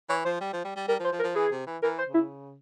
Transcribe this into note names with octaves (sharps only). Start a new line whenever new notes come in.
E3 C#5
F3 C5
G3
F3
G3
G3
G3 A#4
F3
C5
F3
A#4
F3
E3 G#4
C3
E3
E3 A#4
C5
C#3
E4